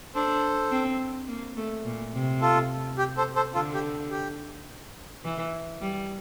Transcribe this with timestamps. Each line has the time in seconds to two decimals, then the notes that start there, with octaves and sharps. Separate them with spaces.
0.15 D4 A4 C5
0.71 C4
1.28 A#3
1.57 A3
1.85 A#2
2.14 C3
2.41 F4 A4
2.98 G4
3.17 A4 C5
3.35 A4 C5
3.54 D3 F4 A4
3.74 G4
4.11 G4
5.25 E3
5.81 G3